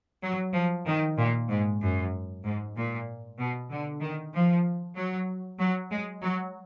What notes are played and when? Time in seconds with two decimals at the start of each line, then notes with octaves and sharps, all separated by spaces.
0.23 F#3
0.54 F3
0.87 D#3
1.17 A#2
1.49 G#2
1.81 F#2
2.44 G#2
2.76 A#2
3.39 B2
3.71 D3
4.01 D#3
4.34 F3
4.96 F#3
5.59 F#3
5.91 G#3
6.22 F#3